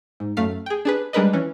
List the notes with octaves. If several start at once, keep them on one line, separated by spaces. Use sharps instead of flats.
G#2
F#2 A3 F5 C7
G#4 G5
D4 G#4 B4
G3 G#3 D4 A#4 B4 D#5
E3 C#4